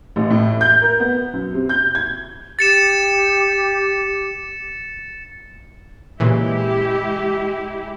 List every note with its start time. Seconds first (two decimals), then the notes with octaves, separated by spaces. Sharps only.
0.16 A1
0.30 A2
0.61 G6
0.82 A#4
1.00 B3
1.33 F#2
1.54 C3
1.69 G6
1.95 G#6
2.59 G4 A6 C#7 E7
6.20 A#2 C#3 E3 G#3 E4 G4